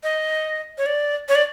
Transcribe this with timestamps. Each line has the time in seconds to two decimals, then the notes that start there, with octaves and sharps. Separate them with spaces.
0.03 D#5
0.78 C#5
0.86 D5
1.29 C#5
1.35 D5